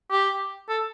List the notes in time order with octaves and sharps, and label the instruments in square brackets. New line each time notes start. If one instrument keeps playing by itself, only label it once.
[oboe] G4
A4